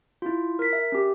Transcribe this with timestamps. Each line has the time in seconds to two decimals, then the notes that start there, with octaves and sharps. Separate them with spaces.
0.22 E4 F4
0.59 A#4 B6
0.73 E5
0.92 C#4 G4